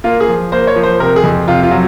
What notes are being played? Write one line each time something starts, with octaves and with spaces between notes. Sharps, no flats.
A#3 F4
G#4
F3
A#3 C5
C#5
F3
C5
C3 A#4
G#4
F2
C3 F4
F4
F#3